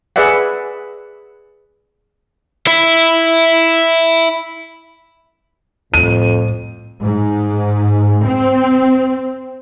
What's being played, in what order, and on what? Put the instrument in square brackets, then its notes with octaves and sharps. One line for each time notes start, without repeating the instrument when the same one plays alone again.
[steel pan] G#4 B4 D5 E5 F#5
[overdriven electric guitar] E4 E5
[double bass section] C2 A2 [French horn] F2 [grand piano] D#7
[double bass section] G#2
C4